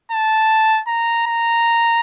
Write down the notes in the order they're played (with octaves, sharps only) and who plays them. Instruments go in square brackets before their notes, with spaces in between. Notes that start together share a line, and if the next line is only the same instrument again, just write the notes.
[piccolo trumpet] A5
A#5
A#5